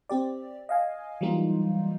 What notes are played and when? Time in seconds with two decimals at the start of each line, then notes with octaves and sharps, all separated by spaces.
0.09 C4 G4 D5
0.69 D#5 F5 G#5
1.21 E3 F#3 G3 A#3 D#4 F4